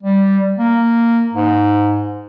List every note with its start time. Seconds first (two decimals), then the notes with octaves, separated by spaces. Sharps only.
0.03 G3
0.58 A#3
1.33 G#2